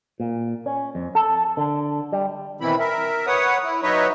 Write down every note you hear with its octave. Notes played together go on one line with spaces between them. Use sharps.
A#2
C#4
F2
A4
D3
G3
B2 D#3 E3 C4 E4 B5
A#4 E5
B4 C#5 F#5 D#6
E4
F#3 D#4 B4 C#5 D#5 E5